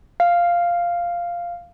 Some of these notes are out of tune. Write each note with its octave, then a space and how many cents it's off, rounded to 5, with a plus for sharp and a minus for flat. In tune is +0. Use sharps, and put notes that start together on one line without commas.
F5 -5